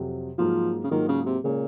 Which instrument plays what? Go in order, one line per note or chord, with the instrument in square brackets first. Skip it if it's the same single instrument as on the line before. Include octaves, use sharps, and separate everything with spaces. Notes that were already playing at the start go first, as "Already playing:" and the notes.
Already playing: [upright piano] F2 C3 F#3
[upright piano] G#2 F#3 A#3 F4 [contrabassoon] F3
[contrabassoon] C#3
[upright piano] G#2 F#3 A#3 F4 [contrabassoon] D#3
[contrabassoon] C#3
C3
[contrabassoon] A#2 [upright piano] C#3 G#3 C#4 G#4